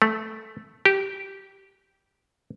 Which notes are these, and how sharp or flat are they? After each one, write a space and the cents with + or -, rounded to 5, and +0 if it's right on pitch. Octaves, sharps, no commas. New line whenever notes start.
A3 -5
G4 -10